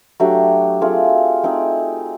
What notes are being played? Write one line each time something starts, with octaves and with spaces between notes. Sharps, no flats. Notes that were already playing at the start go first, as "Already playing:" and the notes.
F#3 A3 D4 G4
A3 C4 F4 G#4
A3 C4 D#4 G#4